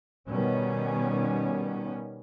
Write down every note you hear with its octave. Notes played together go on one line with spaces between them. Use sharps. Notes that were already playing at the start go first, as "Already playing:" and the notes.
B2 D#3 G3 B3 C#4